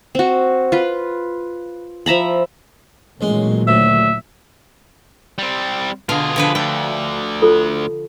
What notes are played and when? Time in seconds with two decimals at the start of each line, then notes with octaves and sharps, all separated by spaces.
0.15 C4 F#4
0.72 F4 B4
2.06 F3 E5 A#5 B5
3.21 A1 A#2 D#3 F#3 G#3 C6
3.68 D2 A2 E5
5.38 G3 C4
6.09 B2 D3 F4 G#4 F5
6.36 D3 F3 B4
6.55 D2 D3 G5
7.42 F4 A4